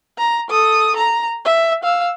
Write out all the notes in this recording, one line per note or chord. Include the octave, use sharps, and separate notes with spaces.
A#5
A4 D#6
A#5
E5
F5 E6